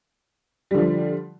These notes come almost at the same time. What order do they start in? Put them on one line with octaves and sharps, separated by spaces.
G3 D3 F3